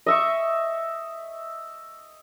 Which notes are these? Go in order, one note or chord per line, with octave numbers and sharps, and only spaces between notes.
D#5 E5 C#6